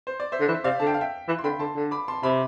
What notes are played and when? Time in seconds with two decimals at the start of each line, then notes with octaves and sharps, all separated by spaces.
0.07 C5
0.20 D5
0.32 C5 E5
0.40 D3
0.48 E3
0.54 E5
0.64 C3 D5 F5
0.80 D3 A5
0.87 G5
0.94 F5
1.01 E5 G5
1.28 E3
1.39 C6
1.44 D3 G5 B5
1.59 D3 A5 C6
1.76 D3
1.91 B5 D6
2.08 A5 C6
2.23 C3 B5 D6